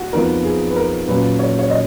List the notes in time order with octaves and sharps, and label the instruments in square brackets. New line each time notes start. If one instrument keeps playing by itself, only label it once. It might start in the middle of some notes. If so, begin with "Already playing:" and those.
Already playing: [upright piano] F#4
[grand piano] F2 F3 B3 D#4 [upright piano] A#4
[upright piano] G#4
B4
A#4
[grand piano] A#2 F#3 C#4 [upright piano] B4
[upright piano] C#5
C#5
D#5